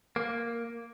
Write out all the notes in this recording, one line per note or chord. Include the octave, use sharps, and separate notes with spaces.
A#3